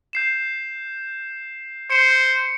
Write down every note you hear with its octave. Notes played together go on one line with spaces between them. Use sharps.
G6 C7 E7
C5 C#7